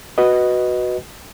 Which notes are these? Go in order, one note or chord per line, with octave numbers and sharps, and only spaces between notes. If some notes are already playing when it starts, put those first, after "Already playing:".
F#4 B4 D#5